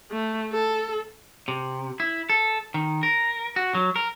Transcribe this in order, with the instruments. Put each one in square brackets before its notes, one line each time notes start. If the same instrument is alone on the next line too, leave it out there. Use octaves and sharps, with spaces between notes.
[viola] A3
A4
[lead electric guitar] C3
E4
A4
D#3
A#4
F#4
F#3
A#4